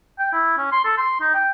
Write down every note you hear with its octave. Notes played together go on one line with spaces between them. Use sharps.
G5
E4
C#4
C6
A4
C6
D#4
G5